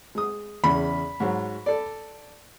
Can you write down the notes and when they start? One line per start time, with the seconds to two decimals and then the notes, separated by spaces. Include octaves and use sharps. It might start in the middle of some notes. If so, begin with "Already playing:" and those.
0.15 G#3 D#6
0.64 E2 C#3 B5
1.20 G#2 F#3
1.66 A4 D5